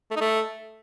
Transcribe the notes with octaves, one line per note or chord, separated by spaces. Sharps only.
A3
D#4
A3